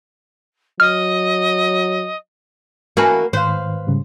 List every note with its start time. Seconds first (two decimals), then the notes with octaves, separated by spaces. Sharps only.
0.80 F#3 D#5 F6
2.97 E3 A#3 C#4 F#4 B4 A5
3.33 G#2 D#3 B4 C5 F5
3.87 G#2 C#3 G3